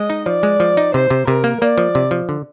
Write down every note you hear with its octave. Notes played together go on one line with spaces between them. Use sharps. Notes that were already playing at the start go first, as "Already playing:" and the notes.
Already playing: G#3 D#5
D#4
F3 D5
G#3
F3
D#4
C3 C5
C3
C3 A#4
A#3
A#3 D5
F3
C3
F3
D3